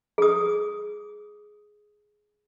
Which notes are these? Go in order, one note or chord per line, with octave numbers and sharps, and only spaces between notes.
G#4 D#6